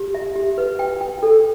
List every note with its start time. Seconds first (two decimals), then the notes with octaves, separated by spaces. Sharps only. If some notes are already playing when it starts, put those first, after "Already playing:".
Already playing: G4
0.14 E5
0.36 G4
0.58 B4
0.79 G5
1.01 G5
1.23 A4